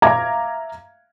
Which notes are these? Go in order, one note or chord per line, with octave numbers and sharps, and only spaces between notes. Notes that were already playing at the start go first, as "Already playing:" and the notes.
E5 F5 A#5 D6 G#6